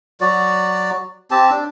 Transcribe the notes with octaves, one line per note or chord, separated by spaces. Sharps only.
F#3 F#4 D5
C4 G4 A5
D4